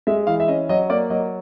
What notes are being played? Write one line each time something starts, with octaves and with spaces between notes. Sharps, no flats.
G#3 E5
E3 F5
E5
C#4 D#5
F#3 D#5
A#3 D5
F#3 D#5